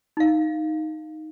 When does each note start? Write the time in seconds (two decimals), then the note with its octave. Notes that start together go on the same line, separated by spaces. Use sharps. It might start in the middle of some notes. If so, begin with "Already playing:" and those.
0.17 D#4 F5